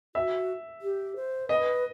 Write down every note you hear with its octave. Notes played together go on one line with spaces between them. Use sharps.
F#4 E5
G4
C5
B4 D#5